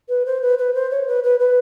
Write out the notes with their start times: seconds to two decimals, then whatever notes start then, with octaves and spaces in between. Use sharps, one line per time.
0.09 B4
0.26 C5
0.42 B4
0.58 B4
0.75 C5
0.91 C#5
1.08 B4
1.24 B4
1.40 B4